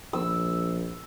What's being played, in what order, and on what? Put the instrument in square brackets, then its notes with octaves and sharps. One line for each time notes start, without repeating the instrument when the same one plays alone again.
[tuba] A#1 [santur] E6